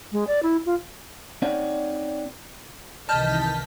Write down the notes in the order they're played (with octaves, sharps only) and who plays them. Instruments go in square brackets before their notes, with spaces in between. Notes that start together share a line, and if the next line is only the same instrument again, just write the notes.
[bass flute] G#3
D5
E4
F4
[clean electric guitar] C4 D#4 C#5 D5 F#5
[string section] C2 D#5 B6 [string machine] D#3 E3 [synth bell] A5 F6 G6